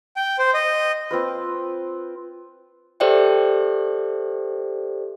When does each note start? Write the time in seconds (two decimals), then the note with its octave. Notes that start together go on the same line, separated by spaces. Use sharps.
0.17 G5
0.39 C5
0.54 D#5
1.11 C4 F4 B4
3.00 G4 A4 C5 D5 E5 G5